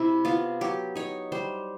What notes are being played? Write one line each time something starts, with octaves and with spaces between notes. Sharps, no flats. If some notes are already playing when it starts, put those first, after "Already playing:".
Already playing: C3 C4 E4
B3 F4
F#3 G4
D#4 C#5
G3 C5